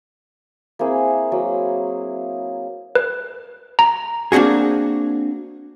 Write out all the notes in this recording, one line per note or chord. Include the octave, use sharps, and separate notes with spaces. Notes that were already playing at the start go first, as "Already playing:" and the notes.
A#3 C4 E4 G#4
F#3 A#3
B4
A#5
A#3 C4 D4 F#4 G#4